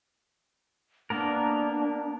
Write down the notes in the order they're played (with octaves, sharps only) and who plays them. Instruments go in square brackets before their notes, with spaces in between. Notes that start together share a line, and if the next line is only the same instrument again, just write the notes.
[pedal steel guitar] A#3 B3 A#4 [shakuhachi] D4